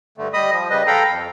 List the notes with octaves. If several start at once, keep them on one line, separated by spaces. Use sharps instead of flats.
G2 D3 A3
G3 D#5 B5 D#6
F3
C#3 G3 B4 D#5
A4 F5 G5 A#5 B5
F2